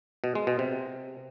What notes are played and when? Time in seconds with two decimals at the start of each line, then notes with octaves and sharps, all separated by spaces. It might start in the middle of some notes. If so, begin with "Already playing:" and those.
0.24 B2
0.35 G#3
0.47 B2
0.59 C3